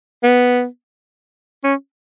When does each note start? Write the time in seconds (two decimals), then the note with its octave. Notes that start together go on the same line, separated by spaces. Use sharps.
0.23 B3
1.64 C#4